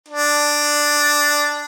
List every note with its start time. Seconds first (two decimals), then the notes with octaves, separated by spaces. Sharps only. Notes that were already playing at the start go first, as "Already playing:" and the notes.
0.09 D4